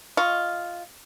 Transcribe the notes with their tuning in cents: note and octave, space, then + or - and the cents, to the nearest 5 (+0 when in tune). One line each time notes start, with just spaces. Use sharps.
F4 +0 D#5 +5 C#6 +0